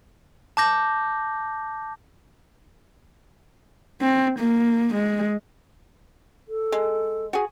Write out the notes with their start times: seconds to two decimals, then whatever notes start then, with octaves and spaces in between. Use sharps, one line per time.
0.57 A5 D6 G6 A#6
4.01 C4
4.39 A#3
4.95 G#3
6.48 A4
6.72 G#3
7.33 F#4 G#4